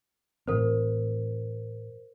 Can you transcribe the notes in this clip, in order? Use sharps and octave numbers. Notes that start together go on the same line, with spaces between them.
A2 E3 C4 A#4 C5